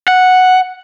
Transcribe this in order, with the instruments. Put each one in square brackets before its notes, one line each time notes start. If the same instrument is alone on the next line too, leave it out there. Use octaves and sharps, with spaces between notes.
[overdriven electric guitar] F#5